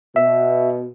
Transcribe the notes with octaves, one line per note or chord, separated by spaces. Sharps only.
B2 E5